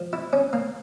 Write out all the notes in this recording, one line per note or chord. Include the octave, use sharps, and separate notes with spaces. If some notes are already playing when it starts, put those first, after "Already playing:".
Already playing: F3
E4
C#4
A#3